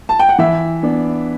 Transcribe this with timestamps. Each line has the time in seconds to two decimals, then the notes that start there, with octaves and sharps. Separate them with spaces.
0.09 A5
0.19 G5
0.29 F#5
0.38 E3 E5
0.83 B3 D4